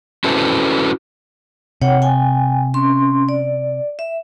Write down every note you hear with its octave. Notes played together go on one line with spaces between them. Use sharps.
C#4 E4 F#4 A4 B4 C5
C3 C#5 F#5 G5
G5 G#5
C#4 C6
D5
E5